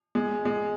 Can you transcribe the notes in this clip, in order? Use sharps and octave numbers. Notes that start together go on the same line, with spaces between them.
G#3
G#3